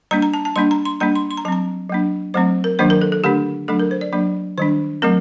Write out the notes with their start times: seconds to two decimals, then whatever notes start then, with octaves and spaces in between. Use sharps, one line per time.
0.11 G3 A#3 D4 A#5
0.22 A#5
0.34 A5
0.45 A5
0.56 G3 A#3 D4 C6
0.71 A#5
0.85 C6
1.00 G3 A#3 D4 A#5
1.15 C6
1.31 C6
1.37 A#5
1.45 F#3 A5
1.48 C4 A#5
1.90 F#3 A#3 D4
2.34 F#3 A3 C4 C5
2.64 A#4
2.79 D#3 F#3 A#3 D4 C5
2.90 A#4
3.02 A4
3.12 A4
3.24 D3 A3 D4 G4
3.68 F#3 A3 D4 A4
3.80 A#4
3.91 C5
4.01 D5
4.13 F#3 A#3 D4 D5
4.58 D#3 G3 D4 C5
5.02 F#3 A3 C4 A#4